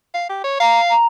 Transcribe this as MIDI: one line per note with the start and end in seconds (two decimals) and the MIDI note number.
0.14 0.27 77
0.29 0.40 67
0.44 0.58 73
0.60 0.94 77
0.60 0.79 82
0.90 1.06 82